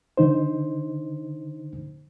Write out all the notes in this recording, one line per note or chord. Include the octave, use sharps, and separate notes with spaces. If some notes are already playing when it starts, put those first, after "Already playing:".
D3 D#4 C5